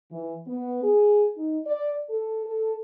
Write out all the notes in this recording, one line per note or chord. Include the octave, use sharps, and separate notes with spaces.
E3
B3
G#4
D#4
D5
A4
A4